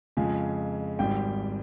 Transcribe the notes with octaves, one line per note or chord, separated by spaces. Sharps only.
F2 C#3 F3 G#3 G#5
G#1 G#2 G3 G5